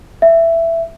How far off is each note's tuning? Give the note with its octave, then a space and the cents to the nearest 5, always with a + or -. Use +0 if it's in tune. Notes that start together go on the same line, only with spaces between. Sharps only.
E5 +10